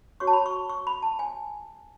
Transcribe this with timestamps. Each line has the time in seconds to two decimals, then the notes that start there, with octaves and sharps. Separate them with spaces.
0.20 F#4 C#5 C#6
0.27 A5
0.33 B5
0.46 C#6
0.69 C#6
0.87 B5
1.02 A5
1.19 G#5